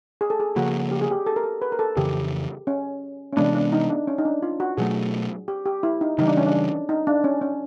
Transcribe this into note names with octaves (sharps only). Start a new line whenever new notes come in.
G#4
A4
G#4
C#3 F3 A#3 F#4
G4
G#4
G4
A4
A#4
A4
B4
A#4
A4
F2 C#3 E3 G4
C#4
C#4
C3 E3 G#3 B3 D4
D4
D#4
D4
C#4
D#4
D4
F4
F#4
B2 F#3 A3 G#4
G4
G4
E4
D#4
C#3 E3 G3 D#4
D4
C#4
D4
D#4
D4
C#4
C#4